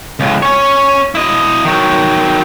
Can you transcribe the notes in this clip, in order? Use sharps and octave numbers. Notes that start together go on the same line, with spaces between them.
C#2 A2
C#4 C#5
E4 D#5
D#3 F#3